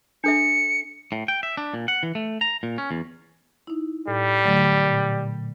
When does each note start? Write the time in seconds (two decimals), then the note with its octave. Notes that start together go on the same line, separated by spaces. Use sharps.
0.24 D4 A4 E5 C#7
1.12 A2
1.28 G5
1.43 E5
1.57 D4
1.74 A#2
1.88 F#5
2.03 E3
2.15 A3
2.41 A#5
2.63 A#2
2.78 C#4
2.91 E2
3.67 D#4 E4
4.08 A2 G3
4.45 D3 F#3 A3
4.84 A#2